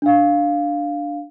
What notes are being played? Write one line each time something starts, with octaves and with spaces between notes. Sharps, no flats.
D4 F5